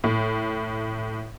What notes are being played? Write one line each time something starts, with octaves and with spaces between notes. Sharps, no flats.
A2